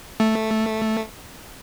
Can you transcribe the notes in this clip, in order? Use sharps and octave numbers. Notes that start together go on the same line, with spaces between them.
A3